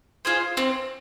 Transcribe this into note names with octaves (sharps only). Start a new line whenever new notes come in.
F4 G#4 C5
C4